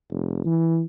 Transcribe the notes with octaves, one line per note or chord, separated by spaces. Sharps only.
F1
E3